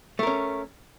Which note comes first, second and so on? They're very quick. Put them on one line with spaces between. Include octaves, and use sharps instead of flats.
A3 A#4 C#4